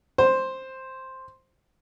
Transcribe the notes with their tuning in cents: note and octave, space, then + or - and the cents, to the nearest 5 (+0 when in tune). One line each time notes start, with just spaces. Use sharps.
C5 +5